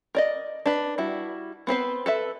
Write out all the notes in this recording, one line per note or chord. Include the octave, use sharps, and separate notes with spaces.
A#4 D5 D#5
D4 B4
G3 E4 F#4
B3 C4 B4 C5
A4 B4 E5